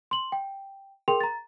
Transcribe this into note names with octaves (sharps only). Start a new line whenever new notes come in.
C6 F#7
G5
G#4 A#4 G5 C6 F7
A#5 A6